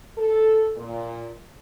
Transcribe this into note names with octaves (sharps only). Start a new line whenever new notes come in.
A4
A#2